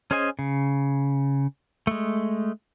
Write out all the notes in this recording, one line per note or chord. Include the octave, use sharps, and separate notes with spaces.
C#4 G#4 C5 D#5 G#5
C#3
G#3 A3